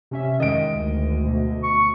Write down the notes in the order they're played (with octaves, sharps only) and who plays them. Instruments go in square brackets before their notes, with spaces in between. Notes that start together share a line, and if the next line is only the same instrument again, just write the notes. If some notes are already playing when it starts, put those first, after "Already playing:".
[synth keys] C3 C#4 E5
[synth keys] D#3 G#3 [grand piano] D#5 D7
[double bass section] D2
[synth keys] B2
[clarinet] C#6